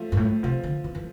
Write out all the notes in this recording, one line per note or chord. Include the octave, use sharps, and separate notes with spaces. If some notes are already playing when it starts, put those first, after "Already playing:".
Already playing: F3 A3
G2
A2
C3 F3
D3
E3
E3